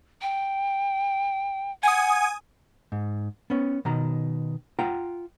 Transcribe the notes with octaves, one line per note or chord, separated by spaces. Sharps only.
G5
F#5 G#5 D#6
G#2
B3 C#4
B2 D#3 A#5
F4 F#5 G5 A#5